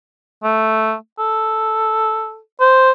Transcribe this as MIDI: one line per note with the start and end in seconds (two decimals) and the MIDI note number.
0.44 0.94 57
1.19 2.40 69
2.61 2.91 72